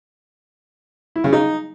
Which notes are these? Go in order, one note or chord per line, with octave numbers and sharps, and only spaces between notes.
E4
C#3
D#4